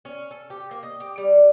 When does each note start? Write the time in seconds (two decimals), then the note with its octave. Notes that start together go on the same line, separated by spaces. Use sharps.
0.05 C#4
0.31 A4
0.50 G4
0.71 A#3
0.83 D#5
1.00 G4
1.18 G3